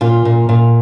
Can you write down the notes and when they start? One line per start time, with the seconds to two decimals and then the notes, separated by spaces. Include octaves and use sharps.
0.01 A#2 F4
0.25 A#2
0.49 A#2